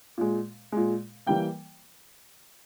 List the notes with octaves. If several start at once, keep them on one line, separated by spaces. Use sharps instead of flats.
A#2 G#3
A#2 G#3
E3 G3 A#3 G5